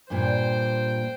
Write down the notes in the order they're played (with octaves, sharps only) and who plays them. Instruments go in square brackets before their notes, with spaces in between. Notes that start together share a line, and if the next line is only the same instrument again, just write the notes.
[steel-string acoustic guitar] G2 A#2 [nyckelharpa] C5 G5